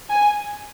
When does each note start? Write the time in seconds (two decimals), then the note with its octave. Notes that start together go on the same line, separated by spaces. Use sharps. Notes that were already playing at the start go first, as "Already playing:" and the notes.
0.10 G#5